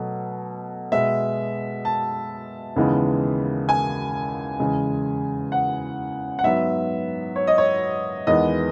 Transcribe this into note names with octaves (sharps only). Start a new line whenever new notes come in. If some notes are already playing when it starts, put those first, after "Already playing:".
Already playing: B2 F#3 A3
B2 G#3 B3 E5
A5
D#2 C#3 E3 G#3 B3
G#5
E2 C#3 G#3
F#5
F#5
G#2 F#3 B3 E5
C#5
D#5
C#5
E2 D#3 G#3 B3 D#5